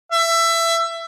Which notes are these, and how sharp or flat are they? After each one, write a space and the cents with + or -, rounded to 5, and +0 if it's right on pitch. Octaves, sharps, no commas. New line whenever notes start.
E5 +20